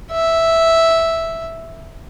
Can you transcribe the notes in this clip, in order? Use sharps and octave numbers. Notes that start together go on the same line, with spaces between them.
E5